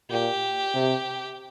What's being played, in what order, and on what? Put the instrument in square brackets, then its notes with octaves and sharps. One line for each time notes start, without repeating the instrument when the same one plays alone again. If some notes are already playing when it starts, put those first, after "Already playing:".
[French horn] A#2 [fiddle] G4
[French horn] C3